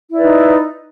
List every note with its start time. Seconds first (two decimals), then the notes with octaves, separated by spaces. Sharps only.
0.11 E4
0.14 D5
0.18 B4
0.22 D#4